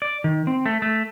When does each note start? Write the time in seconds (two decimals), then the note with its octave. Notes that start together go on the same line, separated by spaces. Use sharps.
0.02 D5
0.24 D#3
0.47 C4
0.66 A3
0.82 A3